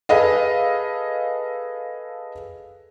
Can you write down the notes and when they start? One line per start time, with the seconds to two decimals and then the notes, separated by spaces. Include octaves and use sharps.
0.09 G#4 A4 B4 D#5 F5